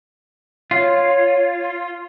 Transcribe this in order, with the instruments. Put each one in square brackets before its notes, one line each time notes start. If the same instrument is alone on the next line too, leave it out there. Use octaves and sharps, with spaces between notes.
[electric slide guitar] F4 [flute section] C#5